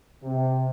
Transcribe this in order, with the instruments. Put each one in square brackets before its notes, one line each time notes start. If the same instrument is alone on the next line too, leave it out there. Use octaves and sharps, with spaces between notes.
[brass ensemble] C3